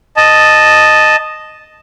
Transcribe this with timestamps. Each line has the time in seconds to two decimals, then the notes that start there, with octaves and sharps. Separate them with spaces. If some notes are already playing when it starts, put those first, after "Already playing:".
0.16 D#5 A5